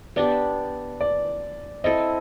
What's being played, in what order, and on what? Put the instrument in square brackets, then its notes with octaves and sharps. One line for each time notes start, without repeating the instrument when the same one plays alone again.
[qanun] B3 D4 G4 [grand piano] D5
[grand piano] D5
[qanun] C4 E4 A4 [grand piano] D#5